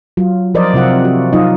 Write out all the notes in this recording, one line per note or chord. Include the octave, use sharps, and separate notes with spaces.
F#3 F4
F3 A#4 C5 D5 D#5
C3 C4 F4 E5 F#5
F#4
F#3 D#4 F4 D#5